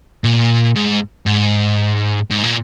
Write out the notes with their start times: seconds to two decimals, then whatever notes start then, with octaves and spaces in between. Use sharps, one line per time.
0.24 A#2
0.76 G#2
1.27 G#2
2.31 G#2
2.44 A#2